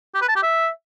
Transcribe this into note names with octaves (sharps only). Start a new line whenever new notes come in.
G4
B4
A5
G4
E5